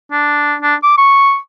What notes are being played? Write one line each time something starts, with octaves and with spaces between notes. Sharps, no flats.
D4
D4
D6
C#6